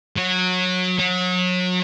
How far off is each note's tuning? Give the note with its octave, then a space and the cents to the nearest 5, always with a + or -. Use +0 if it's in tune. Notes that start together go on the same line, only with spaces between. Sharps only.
F#3 -20
F#3 -30